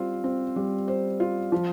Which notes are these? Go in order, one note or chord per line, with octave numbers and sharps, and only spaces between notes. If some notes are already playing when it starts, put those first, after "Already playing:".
Already playing: G3 C4 F4 C5
C4
G3
C5
F4
F3